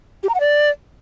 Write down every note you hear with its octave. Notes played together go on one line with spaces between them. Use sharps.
G4
A#5
F#5
D5